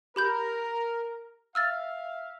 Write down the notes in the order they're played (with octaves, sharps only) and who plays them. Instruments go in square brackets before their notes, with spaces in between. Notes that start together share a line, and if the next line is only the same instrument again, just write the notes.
[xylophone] G4 B5 G6 [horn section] A#4
[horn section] E5 F5 [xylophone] E6 F6 A6